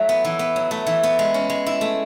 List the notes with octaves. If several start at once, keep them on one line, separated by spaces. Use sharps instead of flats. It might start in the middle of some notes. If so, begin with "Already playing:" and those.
Already playing: F#3 A3 E4
B3
E3
B3
F#3
A3
E3
B3
G#3
C#4
G#3
E4
A3